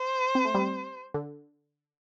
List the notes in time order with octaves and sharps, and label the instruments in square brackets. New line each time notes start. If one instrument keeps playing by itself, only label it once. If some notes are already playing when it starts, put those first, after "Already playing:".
Already playing: [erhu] C5
[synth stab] C4
A3
G3 C4
D3